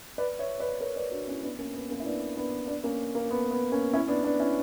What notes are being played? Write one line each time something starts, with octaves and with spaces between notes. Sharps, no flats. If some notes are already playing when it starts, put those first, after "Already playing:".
B4 D5
C#5 E5
B4 D5
A#4 C#5
B4 D5
D4 F#4
C#4 E4
B3 D4
A#3 C#4
B3
A#3 C#4
E4
B3 D4
B3 D4
B3 D4
A#3 C#4
A#3
B3
B3
A#3 C#4
C#4 E4
B3 D4
B3 D4
C#4 E4